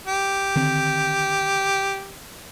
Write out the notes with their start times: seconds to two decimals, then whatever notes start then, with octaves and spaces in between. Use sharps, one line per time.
0.08 G4
0.56 D3 D#3 C4